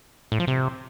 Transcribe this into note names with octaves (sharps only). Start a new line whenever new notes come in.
A2
F3
C3